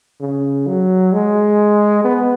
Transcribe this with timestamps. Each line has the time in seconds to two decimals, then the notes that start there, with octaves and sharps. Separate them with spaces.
0.21 C#3
0.67 F#3
1.13 G#3
2.04 B3